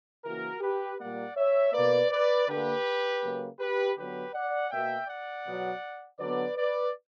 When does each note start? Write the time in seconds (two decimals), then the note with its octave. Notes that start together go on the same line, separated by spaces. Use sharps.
0.24 C#3 E3 A#3 F#4 A#4
0.61 G4 B4
0.98 A#2 G3 A#3 D5 F#5
1.36 C#5 E5
1.72 B2 A#3 B4 D5
2.10 B4 D5
2.47 D3 A#3 G4 B4
3.21 C#3 F#3 A#3
3.59 G4 B4
3.96 D3 F#3 B3 G4 B4
4.33 D5 F#5
4.70 B2 A#3 E5 G5
5.08 D5 F#5
5.45 B2 F#3 B3
6.19 D3 F#3 B3 B4 D5
6.57 B4 D5